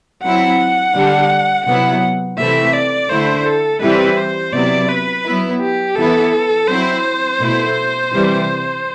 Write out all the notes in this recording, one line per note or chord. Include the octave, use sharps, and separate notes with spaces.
F#3 C4 E4 F#5
D3 G3 D4
C3 F#3 B3 E4 F#5
C3 E3 A3 C4 E4 E5
D5
D3 A3 E4 C5
A4
E3 G3 C4 E4 B4
C5
C3 F#3 B3 E4 D5
B4
F#3 B3 E4
G4
E3 B3 E4 A4
F#3 C4 E4 C5
B2 A3 E4
C3 E3 G3